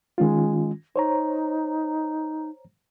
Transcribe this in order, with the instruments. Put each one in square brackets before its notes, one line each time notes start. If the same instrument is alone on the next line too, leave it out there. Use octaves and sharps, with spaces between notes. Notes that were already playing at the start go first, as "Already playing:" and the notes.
[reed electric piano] D#3 C#4 F4 [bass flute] G#3
[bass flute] D#4 [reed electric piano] C5 C#5 A#5